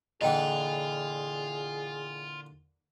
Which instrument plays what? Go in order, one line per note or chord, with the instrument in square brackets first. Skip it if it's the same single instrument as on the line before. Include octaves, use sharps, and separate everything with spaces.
[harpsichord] A#2 D3 E3 [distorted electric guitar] F4 [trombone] G#4 [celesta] D#5 G5